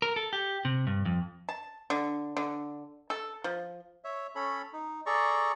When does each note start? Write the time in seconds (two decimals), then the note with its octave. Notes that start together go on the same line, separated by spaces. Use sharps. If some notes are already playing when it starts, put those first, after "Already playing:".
0.02 A#4
0.16 A4
0.33 G4
0.65 C3
0.87 G2
1.05 F2
1.49 A5
1.90 D3
2.37 D3
3.10 A4
3.44 F3
4.04 C#5 E5
4.35 C#4 A4 C#5 B5
4.73 D#4
5.06 G#4 A4 D5 A#5 C#6